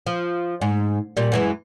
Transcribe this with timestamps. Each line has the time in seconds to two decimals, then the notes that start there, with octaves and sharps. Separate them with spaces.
0.07 F3
0.61 G#2
1.17 A#2 G3
1.32 F#2 E3 G#3